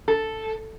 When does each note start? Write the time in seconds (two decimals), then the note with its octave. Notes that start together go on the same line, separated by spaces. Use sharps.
0.08 A4